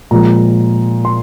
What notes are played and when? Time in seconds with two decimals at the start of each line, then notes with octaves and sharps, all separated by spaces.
0.11 A#2 F3 G#3 A#5
1.05 C6